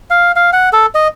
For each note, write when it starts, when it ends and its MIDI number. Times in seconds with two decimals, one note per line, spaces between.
0.10 0.32 77
0.36 0.50 77
0.53 0.69 78
0.73 0.86 69
0.95 1.08 75